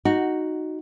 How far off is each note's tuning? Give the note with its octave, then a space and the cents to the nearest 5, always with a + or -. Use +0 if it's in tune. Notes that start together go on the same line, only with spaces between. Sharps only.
D#4 +0 F#4 +0